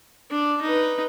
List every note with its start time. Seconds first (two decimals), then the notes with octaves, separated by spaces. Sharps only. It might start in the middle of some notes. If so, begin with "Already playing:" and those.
0.31 D4
0.62 D#4 B4